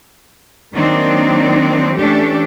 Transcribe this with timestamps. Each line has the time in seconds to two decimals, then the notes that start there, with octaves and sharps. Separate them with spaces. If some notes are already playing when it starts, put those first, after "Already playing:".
0.73 D#3 F#3 A#3 C4 D4 D#4
1.96 E3 A3 C#4 D4 G4 A4